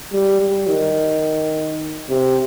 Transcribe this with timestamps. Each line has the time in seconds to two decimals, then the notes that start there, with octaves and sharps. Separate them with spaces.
0.13 G3
0.41 G3
0.69 D#3
2.09 C3